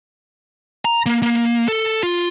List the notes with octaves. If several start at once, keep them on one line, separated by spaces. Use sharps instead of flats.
A#5
A#3
A#3
A4
F4